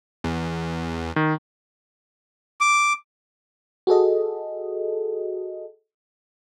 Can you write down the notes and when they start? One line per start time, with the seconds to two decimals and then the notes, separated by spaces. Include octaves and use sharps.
0.24 E2
1.16 D#3
2.61 D6
3.87 F#4 G#4 A4 D#5